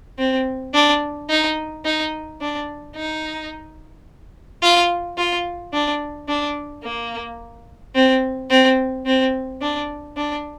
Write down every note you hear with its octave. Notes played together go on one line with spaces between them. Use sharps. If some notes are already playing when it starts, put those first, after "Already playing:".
C4
D4
D#4
D#4
D4
D#4
F4
F4
D4
D4
A#3
C4
C4
C4
D4
D4